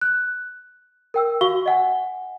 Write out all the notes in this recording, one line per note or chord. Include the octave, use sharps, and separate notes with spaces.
F#6
A#4 G5 E6
F#4 F5 C#6 G7
D#5 F#5 G#5